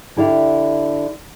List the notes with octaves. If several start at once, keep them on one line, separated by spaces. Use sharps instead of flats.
D3 E4 G4 D5 E5 F5